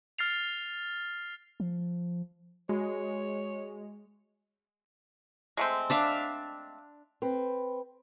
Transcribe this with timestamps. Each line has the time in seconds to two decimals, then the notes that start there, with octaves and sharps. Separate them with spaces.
0.19 F6 A6 C7 F7
1.60 F3
2.69 G#3 F#4 C#5
5.57 G#3 A3 C4
5.90 D4 E5 F5
7.22 C4 B4